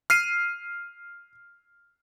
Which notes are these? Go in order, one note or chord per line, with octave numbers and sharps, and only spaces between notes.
F6 C7 D#7